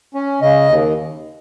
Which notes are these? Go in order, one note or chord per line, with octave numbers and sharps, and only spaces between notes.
C#4
C#3 D#5
D#2